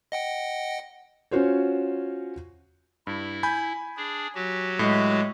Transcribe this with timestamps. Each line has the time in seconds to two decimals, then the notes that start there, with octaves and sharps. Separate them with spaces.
0.12 D#5 F#5 G5
1.31 C#4 F4 F#4 C5 C#5
3.07 G2 E4
3.43 G#5 B5 G6
3.97 D4 G#4
4.35 F#3 F#4 G4
4.79 A2 G#3